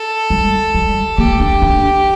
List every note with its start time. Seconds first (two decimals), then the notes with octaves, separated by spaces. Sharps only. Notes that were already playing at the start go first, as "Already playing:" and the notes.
Already playing: A4
0.30 G3
0.75 G3
1.18 A#3 G4
1.40 D4
1.62 D4